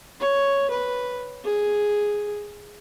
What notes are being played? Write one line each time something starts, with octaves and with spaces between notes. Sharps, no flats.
C#5
B4
G#4